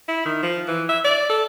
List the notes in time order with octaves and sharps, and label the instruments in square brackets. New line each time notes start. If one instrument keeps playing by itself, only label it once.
[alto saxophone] E4
D#3
F3
E3
E5
D5
A4